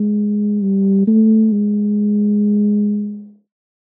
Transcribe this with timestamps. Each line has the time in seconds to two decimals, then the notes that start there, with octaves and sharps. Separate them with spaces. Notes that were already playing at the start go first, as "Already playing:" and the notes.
Already playing: G#3
0.62 G3
1.07 A3
1.52 G#3